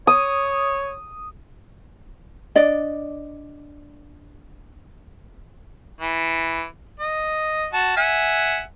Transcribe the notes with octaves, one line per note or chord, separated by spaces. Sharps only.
C#5 D#6
D4 D5 D#5
E3
D#5
F#4 A5
E5 F#5 G#5